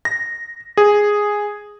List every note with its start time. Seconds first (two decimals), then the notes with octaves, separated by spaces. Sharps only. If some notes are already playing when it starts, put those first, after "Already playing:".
0.05 A#6
0.77 G#4